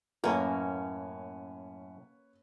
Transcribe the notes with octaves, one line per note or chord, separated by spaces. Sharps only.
F#2 A2 A#3 C#4 B4 C#5